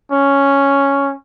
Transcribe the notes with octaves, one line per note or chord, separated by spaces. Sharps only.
C#4